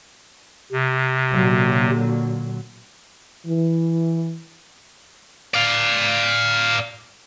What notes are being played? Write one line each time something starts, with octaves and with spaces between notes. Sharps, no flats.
C3
A#2 D3 F#3
E3
D5 F5